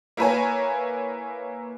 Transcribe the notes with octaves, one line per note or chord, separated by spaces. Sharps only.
A#3 E4 A#4 B4 C#5 G#5